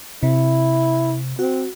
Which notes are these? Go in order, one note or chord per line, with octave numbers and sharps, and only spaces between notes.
C3 E4
C4 F#4